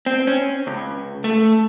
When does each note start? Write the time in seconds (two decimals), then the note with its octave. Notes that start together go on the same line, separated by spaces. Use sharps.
0.06 C4
0.27 C#4
0.67 C#2
1.24 A3